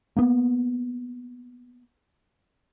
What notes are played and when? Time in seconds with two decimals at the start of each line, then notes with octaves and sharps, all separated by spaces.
0.17 A#3 B3